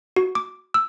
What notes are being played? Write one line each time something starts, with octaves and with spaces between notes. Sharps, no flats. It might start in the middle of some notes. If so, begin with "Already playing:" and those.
F#4
D6
E6